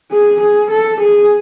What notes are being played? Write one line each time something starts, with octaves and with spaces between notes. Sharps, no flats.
G#4
G#4
A4
G#4